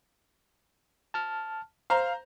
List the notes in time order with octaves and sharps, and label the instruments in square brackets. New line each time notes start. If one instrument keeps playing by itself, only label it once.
[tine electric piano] A5 F6
[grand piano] C5 A#5 [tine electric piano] F5